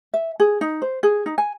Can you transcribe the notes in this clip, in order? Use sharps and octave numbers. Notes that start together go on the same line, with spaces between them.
E5
G#4
D#4
C5
G#4
D#4
G#5